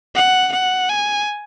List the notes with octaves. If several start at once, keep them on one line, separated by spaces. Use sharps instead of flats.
F#5
F#5
G#5